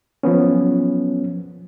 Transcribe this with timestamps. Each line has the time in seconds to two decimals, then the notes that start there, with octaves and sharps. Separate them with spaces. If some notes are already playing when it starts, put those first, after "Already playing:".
0.23 F3 F#3 B3 C#4